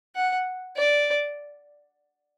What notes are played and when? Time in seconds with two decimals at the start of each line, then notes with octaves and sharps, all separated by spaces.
0.16 F#5
0.76 D5